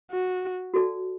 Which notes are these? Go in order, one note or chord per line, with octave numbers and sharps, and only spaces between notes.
F#4
F#4 A4 D5 A5